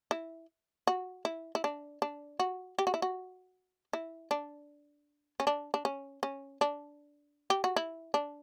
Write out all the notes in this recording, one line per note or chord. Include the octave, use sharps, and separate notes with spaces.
E4
F#4
E4
E4
D4
D4
F#4
G4
F#4
E4
F#4
E4
D4
C#4
D4
D4
C#4
C#4
D4
G4
F#4
E4
D4